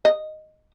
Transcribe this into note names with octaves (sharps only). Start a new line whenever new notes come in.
D#5